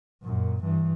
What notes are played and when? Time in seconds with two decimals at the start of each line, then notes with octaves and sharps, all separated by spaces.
0.22 F#2 A#2
0.64 G2 E3